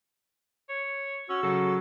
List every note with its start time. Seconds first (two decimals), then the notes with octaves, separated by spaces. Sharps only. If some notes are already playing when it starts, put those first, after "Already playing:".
0.69 C#5
1.30 C#4 F#4 E6
1.43 C#3 F#3 A4